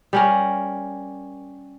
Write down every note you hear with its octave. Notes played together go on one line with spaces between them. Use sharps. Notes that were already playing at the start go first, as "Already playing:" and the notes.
G3 C#4 A#4